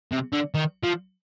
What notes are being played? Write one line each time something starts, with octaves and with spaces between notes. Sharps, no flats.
C3
D3
D#3
F3